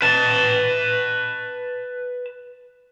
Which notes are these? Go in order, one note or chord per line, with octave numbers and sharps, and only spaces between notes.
B4 A5